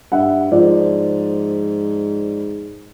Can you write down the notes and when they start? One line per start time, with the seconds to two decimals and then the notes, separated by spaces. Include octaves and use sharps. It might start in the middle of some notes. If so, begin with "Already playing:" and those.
0.12 G2 E5 F#5
0.51 G#2 F3 D5